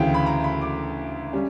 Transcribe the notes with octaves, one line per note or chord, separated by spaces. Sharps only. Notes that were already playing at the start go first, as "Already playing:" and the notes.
Already playing: D2 C#3 E3 G5
B5
A#5
B5
D6
G3 C#4